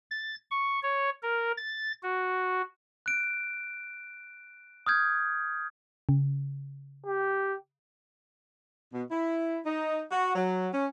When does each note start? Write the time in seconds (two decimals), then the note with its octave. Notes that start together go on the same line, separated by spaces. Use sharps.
0.11 A6
0.51 C#6
0.83 C#5
1.23 A#4
1.57 A6
2.03 F#4
3.06 F#6 D7
4.87 D#6 F6 G6 G#6
6.09 C#3
7.06 G4
8.92 B2
9.10 E4
9.66 D#4
10.12 F#4
10.35 F#3
10.73 C#4